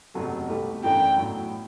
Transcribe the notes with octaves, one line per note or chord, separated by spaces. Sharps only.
F#1 E2 C3 F#3 A3
C2 B2 A3 E4 G4
F#2 E3 A3 D4 G5
B1 A2 F#3